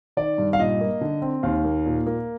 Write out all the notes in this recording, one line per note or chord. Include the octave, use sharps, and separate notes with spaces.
D#3 D5
G2
F5
A#2 D#5
A#3
D3
C4
D#2 F5
A#3
A#2
A#3